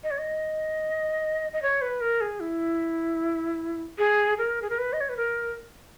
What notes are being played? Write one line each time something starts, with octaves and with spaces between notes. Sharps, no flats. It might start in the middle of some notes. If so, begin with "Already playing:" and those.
D#5
C#5
D#5
D#5
C#5
B4
A#4
G#4
E4
G#4
A#4
G#4
A#4
B4
D#5
C#5
B4
A#4